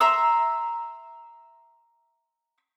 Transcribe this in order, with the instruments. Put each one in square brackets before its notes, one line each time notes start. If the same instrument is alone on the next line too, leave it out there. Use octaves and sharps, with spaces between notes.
[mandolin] E5 A#5 C6 E6